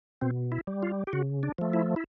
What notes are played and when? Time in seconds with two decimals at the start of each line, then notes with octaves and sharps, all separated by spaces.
0.21 B2 C4
0.52 E4
0.67 G3
0.83 F4
1.07 G4
1.13 C#3 F#4
1.43 D4
1.58 F3 A3
1.73 E4
1.96 E4